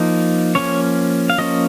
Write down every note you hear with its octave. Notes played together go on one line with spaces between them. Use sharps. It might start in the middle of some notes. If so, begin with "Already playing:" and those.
Already playing: F3 A#3 D#4
F3 A#3 C#4 C#5
F5
F3 A#3 C#4 D#5